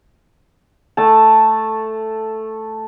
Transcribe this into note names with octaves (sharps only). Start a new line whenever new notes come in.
A3 A5